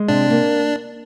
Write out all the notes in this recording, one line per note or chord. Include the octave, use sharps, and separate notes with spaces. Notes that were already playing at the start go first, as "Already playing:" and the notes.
Already playing: G#3
C3 D4
A#3